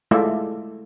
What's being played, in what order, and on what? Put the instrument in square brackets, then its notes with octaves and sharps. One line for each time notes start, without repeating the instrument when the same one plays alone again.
[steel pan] G#3 A3 E4 F4 D5 E5